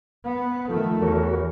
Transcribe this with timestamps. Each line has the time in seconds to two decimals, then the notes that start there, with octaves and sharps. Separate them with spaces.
0.24 B3
0.69 D#3 F3 A3 A4
1.02 E2 F#4 A#4 C#5